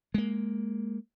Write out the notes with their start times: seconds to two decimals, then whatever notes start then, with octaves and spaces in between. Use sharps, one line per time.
0.14 G#3 A#3